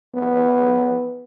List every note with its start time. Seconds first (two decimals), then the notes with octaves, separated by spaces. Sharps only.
0.15 B3